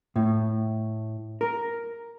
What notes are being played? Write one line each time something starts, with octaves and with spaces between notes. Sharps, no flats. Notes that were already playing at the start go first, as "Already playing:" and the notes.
A2
A#4